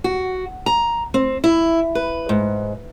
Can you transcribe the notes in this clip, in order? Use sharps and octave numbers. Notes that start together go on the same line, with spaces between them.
F#4
A#5
C4
E4
B4
G#2